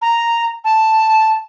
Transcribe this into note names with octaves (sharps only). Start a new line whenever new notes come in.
A#5
A5